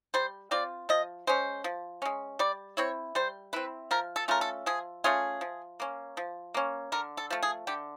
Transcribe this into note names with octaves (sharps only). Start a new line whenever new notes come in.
G3 C5
C4 F4 D5
F3 D#5
G#3 C#4 C5
F3
G#3 C#4
G3 D5
C4 E4 C#5
G3 C5
C4 E4 B4
F3 A#4
A4
A3 C#4 F4 A#4
A4
F3 G#4
A3 C#4 F4 G#4
F3
A#3 C#4
F3
A#3 C#4
D3 A#4
A4
F3 A3
G#4
D3 G4